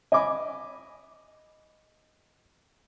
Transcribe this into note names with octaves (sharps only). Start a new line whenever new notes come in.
D#5 G#5 B5 D6